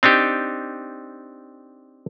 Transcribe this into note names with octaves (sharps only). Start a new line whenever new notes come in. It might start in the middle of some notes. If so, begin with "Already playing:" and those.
C4 D4 D#4 G4